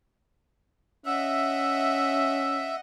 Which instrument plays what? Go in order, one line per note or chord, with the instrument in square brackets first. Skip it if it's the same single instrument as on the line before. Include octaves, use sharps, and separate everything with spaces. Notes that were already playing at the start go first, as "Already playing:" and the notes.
[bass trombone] C#4 [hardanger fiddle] D#5 F#5 [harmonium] E5